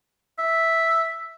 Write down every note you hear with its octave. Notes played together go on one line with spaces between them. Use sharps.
E5